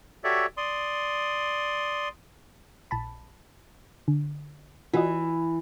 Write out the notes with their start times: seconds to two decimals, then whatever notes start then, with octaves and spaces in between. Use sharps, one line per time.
0.24 F#4 G4 A4 C#5 D5 E5
0.57 D5 C6 D#6
2.91 A#1 A5 B5
4.08 D3
4.94 E3 F4 F#4 D#5